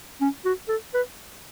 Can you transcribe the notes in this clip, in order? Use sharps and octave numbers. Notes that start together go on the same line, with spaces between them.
C#4
F#4
A4
B4